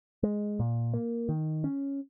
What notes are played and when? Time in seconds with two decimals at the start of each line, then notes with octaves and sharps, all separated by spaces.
0.23 G#3
0.59 A#2
0.94 A#3
1.29 D#3
1.64 C#4